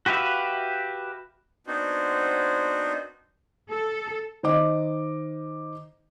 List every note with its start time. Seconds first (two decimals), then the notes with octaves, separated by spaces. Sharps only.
0.06 F#4 G4 B4 E5 F5
1.67 B3 C4 D4 D#4 F#4 C5
3.70 A4
4.43 D#3 C5 D#5 D6